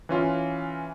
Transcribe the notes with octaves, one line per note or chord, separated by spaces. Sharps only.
E3 C#4 F4